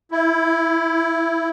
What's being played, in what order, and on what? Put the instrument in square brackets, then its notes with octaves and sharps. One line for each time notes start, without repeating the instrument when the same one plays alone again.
[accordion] E4